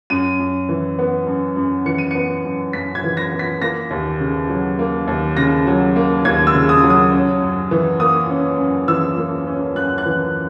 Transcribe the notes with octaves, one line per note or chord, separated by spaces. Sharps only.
F#2 D#7
F#2
E3
B3
F#2
F#2
E3 C#7
D#7
B3 C#7
F#2
F#2 B6
G#6
E3
A#6
B3
B6
A#3 A#6
D#2
C#3
F#3
A#3
D#2
C#3 A#6
F#3
A#3
D#2 G#6
E6
C#3
D#6
F#3
D#6
C#4
F#2
E3
A#3 D#6
C#4
F#2
E3 E6
A#3
C#4
F#2 F#6
F#6
E3